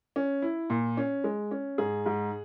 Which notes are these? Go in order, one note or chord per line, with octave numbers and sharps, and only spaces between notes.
C#4
E4
A#2
C#4
G#3
C#4
G#2 G#4
G#2